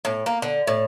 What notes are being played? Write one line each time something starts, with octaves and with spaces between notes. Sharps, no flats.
A2
A#3
D3
A2